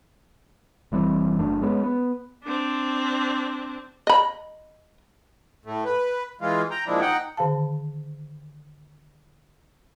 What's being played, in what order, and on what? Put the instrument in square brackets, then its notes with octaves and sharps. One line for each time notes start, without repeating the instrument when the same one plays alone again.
[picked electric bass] F1 E3 G3 C4
F#1 F#2 A3 D4
G#3 B3 C#4
B3
[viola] C4 D4
[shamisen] D#5 B5
[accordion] A2 A3
B4
E3 G#3 F4
G5 A#5
A#2 F3 G#3 D4 E4
D#4 F#5 G5
[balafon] D3 D#3 G#4 F5 A5